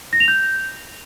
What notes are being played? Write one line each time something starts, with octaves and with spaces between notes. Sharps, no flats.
A#6
F7
G6